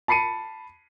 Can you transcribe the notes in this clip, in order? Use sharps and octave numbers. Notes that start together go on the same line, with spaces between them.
A5 B5 C7 C#7 D#7